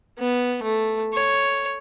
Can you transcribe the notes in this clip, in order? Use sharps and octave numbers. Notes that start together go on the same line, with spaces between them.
B3
A3
C#5